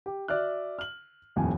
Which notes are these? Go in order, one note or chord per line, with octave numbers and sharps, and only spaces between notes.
G4
F#4 D5 E5 F6 F#6
F6 F#7
D#1 F2 A2 G#5